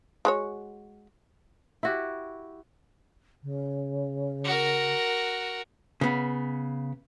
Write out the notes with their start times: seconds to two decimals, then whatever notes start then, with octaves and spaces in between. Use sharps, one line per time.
0.25 G#3 F#4 C#5
1.83 E4 F#4 G4
3.43 C#3
4.44 F#4 A#4
6.01 C#3 B3